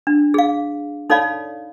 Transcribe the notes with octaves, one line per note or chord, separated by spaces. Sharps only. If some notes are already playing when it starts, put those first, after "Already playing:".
D4
G#4 F5
D#4 A4 C#5 D5 F5 B5